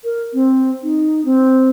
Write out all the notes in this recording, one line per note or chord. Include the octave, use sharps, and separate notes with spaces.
A#4
C4
D#4
C4